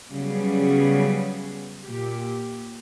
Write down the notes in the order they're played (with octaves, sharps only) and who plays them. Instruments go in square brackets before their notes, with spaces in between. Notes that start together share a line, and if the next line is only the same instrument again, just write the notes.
[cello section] C#3 F#3 G3 B3 C#4 G#4
A#2 G4